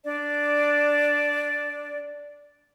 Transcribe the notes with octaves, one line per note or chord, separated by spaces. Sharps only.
D4 D5